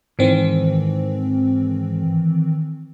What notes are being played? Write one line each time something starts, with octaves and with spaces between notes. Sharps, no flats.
G#2 D#3 E3 C4